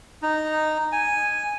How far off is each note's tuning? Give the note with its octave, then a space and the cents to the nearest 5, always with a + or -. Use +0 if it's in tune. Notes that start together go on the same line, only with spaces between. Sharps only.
D#4 -10
G#5 -5